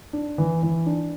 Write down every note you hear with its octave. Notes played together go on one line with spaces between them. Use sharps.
D4
E3
E3
D4